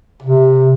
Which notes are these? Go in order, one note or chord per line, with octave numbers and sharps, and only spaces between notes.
C3